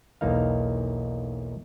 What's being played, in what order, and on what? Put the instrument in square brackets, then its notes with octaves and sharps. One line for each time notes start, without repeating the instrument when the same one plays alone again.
[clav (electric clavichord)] B1 E2 A#3 D#4 F5